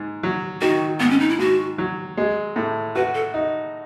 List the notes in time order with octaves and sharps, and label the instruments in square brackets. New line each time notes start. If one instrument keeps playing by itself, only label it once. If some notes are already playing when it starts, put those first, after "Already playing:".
Already playing: [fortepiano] G#2
F#3
[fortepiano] D#3 [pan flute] F#4
[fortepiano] G#2 [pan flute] B3
[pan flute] C#4
D#4
E4
[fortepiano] G#2 [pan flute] F#4
[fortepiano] F#3
G#3
A2
[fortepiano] F#4 [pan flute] B4
[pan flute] A4
[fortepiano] D#4